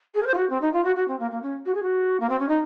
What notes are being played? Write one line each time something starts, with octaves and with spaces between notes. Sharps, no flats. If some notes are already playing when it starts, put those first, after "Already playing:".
G#4
A#4
C5
F4
F#4
C4
D#4
F4
F#4
F#4
C4
A#3
A#3
C#4
F#4
G#4
F#4
A#3
C4
C#4
D#4